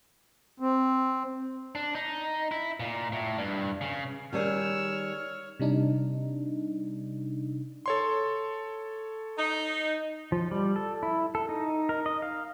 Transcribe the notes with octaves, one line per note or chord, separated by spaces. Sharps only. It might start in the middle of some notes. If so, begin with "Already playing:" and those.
C4
D4
D#4
E4
A#2
A2
G2
C#3
D#3 G3 G#4 C#5 E6 F6
C3 G3 D4 D#4
A4 C#5 C6
D#4
F3
G3
A4
E4
A4
D#4
A#4
D#5
F5